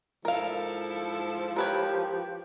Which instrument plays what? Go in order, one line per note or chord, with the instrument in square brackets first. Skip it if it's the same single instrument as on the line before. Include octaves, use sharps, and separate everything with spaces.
[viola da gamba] G#2 E4 A4 [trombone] F3 [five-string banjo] A#4 F5
[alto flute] G4 [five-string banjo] A#4 B4 C#5